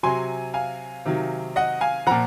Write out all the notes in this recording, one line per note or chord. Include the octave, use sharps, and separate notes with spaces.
C3 F#3 G#5 C6
F5 G#5
C3 D#3 F#3
D#5 F#5
F5 G#5
A#2 F3 F#5 A#5